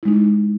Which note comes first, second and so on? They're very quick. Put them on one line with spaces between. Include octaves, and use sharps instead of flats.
E4 G#3 D#4